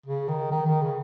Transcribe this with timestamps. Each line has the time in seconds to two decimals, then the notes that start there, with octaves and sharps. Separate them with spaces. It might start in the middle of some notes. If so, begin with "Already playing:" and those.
0.06 C#3
0.28 D#3
0.51 D#3
0.66 D#3
0.82 C#3